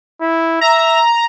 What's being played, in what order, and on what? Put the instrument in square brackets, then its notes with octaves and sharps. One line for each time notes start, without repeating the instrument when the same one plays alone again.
[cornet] E4
[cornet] E5 [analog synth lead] A#5